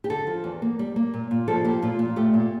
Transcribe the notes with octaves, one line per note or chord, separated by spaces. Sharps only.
G4
D3 A4
F3
E2
A#3
G3
A#3
A#2
A#2
F3 A4
A#3 G4
A#2 F4
A#2
A3 G4
A#2